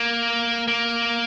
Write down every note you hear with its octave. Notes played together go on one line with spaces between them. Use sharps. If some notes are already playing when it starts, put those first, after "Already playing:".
Already playing: A#3
A#3